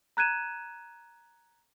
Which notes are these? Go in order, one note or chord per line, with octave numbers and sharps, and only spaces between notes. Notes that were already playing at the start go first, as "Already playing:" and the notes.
A#5 F#6 G#6 D#7 E7